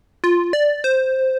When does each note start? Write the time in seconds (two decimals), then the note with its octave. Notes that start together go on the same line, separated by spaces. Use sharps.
0.24 F4
0.53 D5
0.84 C5